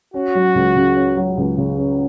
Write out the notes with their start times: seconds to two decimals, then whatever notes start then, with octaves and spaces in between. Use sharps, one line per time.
0.14 C#4 F#4
0.35 F#3
0.55 C#2
0.76 C#3
0.96 C#4
1.17 F#3
1.37 C#2
1.58 C#3
1.77 C#4